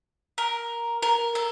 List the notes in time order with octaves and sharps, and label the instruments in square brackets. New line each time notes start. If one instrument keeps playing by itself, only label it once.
[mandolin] A#4
A#4
A4